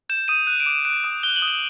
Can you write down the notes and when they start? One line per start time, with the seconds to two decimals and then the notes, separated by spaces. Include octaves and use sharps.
0.09 G6 E7
0.28 D#6 D#7
0.47 F#6 D#7
0.60 D7
0.66 D6 D#7
0.85 F#6 D7
1.04 D#6
1.23 F#6 G7
1.36 F#7
1.42 D#6
1.48 F#7